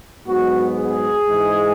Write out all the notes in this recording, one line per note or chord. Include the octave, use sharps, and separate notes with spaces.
G#2 F#3 B3 F#4
G#4
G#2 E3 G#3